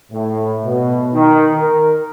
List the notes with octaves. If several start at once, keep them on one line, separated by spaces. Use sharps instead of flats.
A2
B2
D#3
A#4